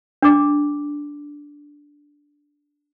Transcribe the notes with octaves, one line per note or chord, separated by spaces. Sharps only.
D4 D6